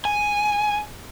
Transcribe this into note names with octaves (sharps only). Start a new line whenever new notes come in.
G#5